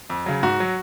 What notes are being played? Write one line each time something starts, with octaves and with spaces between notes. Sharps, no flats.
F2
C#3 F#3
G#2 F#4
F#3